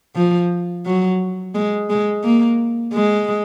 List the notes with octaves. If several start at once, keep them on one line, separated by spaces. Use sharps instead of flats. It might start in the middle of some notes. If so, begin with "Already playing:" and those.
F3
F#3
G#3
G#3
A#3
G#3